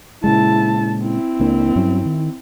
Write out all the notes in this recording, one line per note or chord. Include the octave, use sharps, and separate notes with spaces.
A#2 C#3 G#3 E4 A5
C4 E4
C#2 A#3 D4
G2 F#3 C#4
D#3